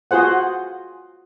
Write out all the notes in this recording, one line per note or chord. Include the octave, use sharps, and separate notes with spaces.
F4 F#4 G#4 C5 F#5